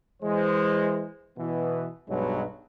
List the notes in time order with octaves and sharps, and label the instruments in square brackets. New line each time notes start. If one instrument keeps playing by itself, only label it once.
[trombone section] E3 G#3 C5
B2 E3 B3
B1 G2 B2 F#3 G#3 B4